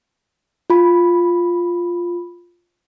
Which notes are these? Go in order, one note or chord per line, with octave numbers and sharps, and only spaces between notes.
F4 B5